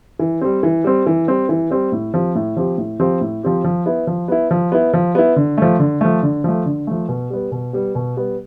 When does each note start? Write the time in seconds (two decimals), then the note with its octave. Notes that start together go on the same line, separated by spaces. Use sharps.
0.19 E3
0.41 G3 C4
0.63 E3
0.84 G3 C4
1.06 E3
1.27 G3 C4
1.49 E3
1.71 G3 C4
1.92 A2
2.14 F3 C4 G4
2.35 A2
2.56 F3 C4 G4
2.78 A2
2.99 F3 C4 G4
3.21 A2
3.43 F3 C4 G4
3.64 F3
3.86 B3 E4
4.07 F3
4.28 B3 E4
4.51 F3
4.72 B3 E4
4.93 F3
5.15 B3 E4
5.36 D3
5.58 F3 A3
5.79 D3
6.01 F3 A3
6.23 D3
6.44 F3 A3
6.66 D3
6.87 F3 A3
7.09 B2
7.30 G3 B3
7.52 B2
7.73 G3 B3
7.95 B2
8.17 G3 B3